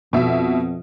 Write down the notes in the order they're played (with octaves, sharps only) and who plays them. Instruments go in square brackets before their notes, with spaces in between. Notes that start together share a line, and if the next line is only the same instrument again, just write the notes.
[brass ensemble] F2 [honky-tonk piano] B2 E5